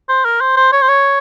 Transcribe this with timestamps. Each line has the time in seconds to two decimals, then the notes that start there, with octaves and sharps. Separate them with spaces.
0.09 C5
0.25 A#4
0.41 C5
0.57 C5
0.72 C#5
0.82 C5
0.88 C#5